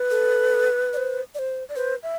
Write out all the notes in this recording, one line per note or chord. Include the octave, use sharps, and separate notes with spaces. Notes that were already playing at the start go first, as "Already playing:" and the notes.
Already playing: B4
A4
D5
C5
D5
C5
D5
B4 C5
E5